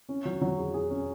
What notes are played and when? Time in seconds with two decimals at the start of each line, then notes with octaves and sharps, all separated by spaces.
0.09 C#4
0.25 F#3
0.42 F#3
0.58 G#4
0.74 G#4
0.90 C#4